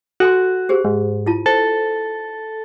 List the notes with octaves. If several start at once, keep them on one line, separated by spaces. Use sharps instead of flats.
F#4 A4 G#5 C6
G4 G#4 C5
G#2
E4 F4 A5
A4 C5